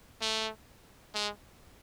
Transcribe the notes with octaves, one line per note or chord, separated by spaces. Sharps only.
A3
G#3